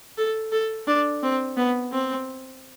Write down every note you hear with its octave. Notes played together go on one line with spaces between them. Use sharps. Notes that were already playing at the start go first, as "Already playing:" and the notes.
A4
A4
D4
C4
B3
C4